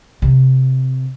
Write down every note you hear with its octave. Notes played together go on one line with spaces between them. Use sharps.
C3